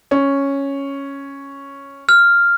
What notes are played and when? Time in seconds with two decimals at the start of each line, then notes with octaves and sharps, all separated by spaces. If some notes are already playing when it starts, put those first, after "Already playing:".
0.11 C#4
2.09 F6